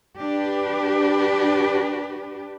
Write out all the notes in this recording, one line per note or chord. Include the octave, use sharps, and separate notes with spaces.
D4 G4 B4